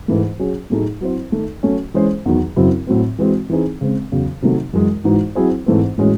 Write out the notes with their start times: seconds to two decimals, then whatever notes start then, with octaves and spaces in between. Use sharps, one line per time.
0.08 G#2 E3 A3
0.39 F#3 C#4 G#4
0.70 A2 F#3 A3 D#4 G#4
1.01 F#3 C4 E4 C5
1.32 D#3 A3 D#4 A4
1.63 F#3 A3 C#4 F#4
1.94 E3 G#3 C#4 G#4 C5
2.26 E2 D#3 F#3
2.56 F#2 C#3 F#3 C4 E4
2.87 A2 F#3 C4
3.19 E3 G#3 C4 F#4
3.49 E3 C4 D#4 G#4
3.81 C#3 G#3 C4
4.12 E2 C#3 F#3 C#4
4.42 C3 D#3 F#3 A3 D#4
4.73 F#2 E3 G#3
5.04 G#2 E3 G#3 D#4 F#4
5.35 F#3 C4 E4 G#4 C5
5.66 G#2 E3 A3 C4
5.98 A2 E3 G#3 C#4 F#4